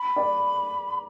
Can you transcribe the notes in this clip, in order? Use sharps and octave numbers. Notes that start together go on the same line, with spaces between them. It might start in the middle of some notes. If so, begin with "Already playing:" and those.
Already playing: B5
D5